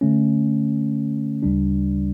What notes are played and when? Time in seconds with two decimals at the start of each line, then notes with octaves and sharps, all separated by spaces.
0.01 D3 A3 C#4
1.43 D2 C#3 G3 D4